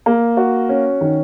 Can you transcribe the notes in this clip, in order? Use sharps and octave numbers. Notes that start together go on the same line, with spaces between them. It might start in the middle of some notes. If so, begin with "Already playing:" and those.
A#3
F#4
C#4
D#3